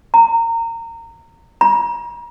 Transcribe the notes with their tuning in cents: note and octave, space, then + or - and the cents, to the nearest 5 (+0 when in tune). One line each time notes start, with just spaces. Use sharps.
A#5 -25
A#5 +40